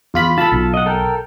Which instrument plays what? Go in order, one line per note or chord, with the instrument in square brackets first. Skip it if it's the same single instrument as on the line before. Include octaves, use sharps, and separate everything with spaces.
[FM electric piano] E2 F4 B5
[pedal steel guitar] F4 A4 [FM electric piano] A5 B5
[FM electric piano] B1
[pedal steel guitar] D#5 F#5
A4 A#4 G5